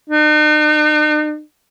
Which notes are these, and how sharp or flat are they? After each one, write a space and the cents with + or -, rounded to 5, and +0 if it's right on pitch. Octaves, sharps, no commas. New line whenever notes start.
D#4 -45